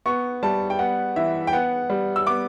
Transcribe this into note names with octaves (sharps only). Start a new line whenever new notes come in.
B3 C#6
G3 A5
G5
B3 F#5
E3 E5
G5
B3 F#5
G3
E6
B3 D6